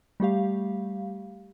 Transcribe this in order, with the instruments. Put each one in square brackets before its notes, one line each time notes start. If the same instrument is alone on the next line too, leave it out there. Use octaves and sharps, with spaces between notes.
[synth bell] G3 A3 G4 F5